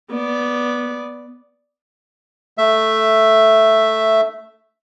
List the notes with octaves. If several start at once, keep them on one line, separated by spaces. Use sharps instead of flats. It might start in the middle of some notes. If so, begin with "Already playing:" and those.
B3 D5
A3 E5